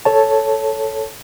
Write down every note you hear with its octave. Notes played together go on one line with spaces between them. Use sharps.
A4 C#5 A5